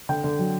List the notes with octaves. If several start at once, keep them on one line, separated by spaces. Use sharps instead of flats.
D3 G5
D3
F#3